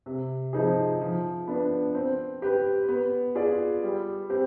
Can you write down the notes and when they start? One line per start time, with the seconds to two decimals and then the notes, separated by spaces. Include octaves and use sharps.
0.06 C3
0.53 F3 C4 D#4 G#4
1.01 F3
1.48 B3 D4
1.95 C4
2.42 G4 B4
2.88 B3
3.35 F4 G#4 D5
3.83 G3
4.30 C4 G4